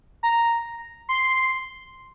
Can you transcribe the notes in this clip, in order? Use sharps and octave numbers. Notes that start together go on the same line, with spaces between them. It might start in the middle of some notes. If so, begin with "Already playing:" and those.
A#5
C6